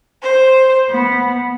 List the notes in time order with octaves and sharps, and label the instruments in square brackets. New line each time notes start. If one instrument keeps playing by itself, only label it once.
[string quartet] C5
B3